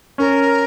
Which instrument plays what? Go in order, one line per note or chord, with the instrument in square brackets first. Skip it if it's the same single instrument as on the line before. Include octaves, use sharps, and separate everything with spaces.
[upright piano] C#4 [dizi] A#4